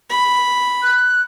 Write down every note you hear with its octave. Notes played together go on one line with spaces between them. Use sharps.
B5
F#6